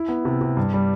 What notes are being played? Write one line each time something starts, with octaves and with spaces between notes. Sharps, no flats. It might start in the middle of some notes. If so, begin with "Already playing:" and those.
Already playing: E4
B3
C3
C3
G2
G3